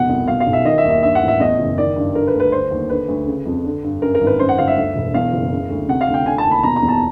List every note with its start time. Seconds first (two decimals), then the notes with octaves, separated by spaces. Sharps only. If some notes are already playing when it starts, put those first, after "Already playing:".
Already playing: F1 B2 F#5
0.09 C2
0.28 B2 F5
0.40 F5
0.47 B1
0.53 E5
0.65 D#3 D#5
0.78 E5
0.84 D#2
0.90 E5
1.03 G2 E5
1.15 F#5
1.22 A1
1.28 E5
1.40 E2 D#5
1.58 F#1
1.78 D#3 D5
1.96 G2
2.15 D3 A#4
2.27 B4
2.34 D2
2.40 B4
2.52 D3 C5
2.71 D#2
2.89 D3 B4
3.08 D2
3.27 C#3
3.45 F2
3.65 D3
3.83 G2
4.02 F#2 A#4
4.15 A#4
4.21 G#1
4.27 B4
4.39 F#2 C5
4.49 F#5
4.58 G1 F5
4.67 E5
4.77 D2
4.96 E1
5.14 E2 F5
5.33 F#1
5.51 C#3
5.70 D2
5.89 C3 F#5
6.01 F5
6.08 D2
6.14 G5
6.26 D3 G#5
6.38 A5
6.45 D#2
6.51 B5
6.63 B2 A#5
6.76 A#5
6.82 E2
6.88 A5